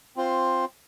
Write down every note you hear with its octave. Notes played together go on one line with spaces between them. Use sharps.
C4 F4 C5